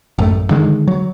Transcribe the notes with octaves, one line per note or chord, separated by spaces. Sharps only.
A1 F#2 A3
D3 D#3 G#3
F#3